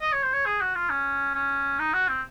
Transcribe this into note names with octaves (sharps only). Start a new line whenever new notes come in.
D#5
C#5
C5
C#5
G#4
F#4
F4
C#4
C#4
D#4
F#4
C4